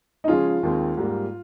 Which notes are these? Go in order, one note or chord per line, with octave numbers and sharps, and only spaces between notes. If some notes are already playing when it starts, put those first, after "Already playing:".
D#4
C#3 F3 G#3 C#4 F4 G#4
D#2 D#3 G#3 C4
G#2 G3 A#3